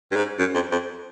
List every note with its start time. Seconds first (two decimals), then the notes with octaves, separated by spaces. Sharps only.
0.11 G2
0.16 G#2
0.39 F#2
0.54 F2
0.72 F2